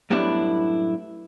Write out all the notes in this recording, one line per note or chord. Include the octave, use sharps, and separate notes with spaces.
F#2 A2 G3 B3 D4 E4